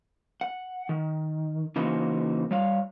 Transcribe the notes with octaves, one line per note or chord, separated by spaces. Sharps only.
F#5
D#3
C#3 E3 A#3 D#4 F#4 C5
G3 C#5 F5